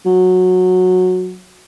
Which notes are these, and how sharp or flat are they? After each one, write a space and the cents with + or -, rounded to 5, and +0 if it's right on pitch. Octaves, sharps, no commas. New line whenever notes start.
F#3 -15